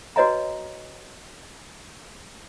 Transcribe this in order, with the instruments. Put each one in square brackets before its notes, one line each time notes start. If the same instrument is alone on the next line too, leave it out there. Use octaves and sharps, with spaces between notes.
[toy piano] F#4 B4 C#5 D#5 G#5 A#5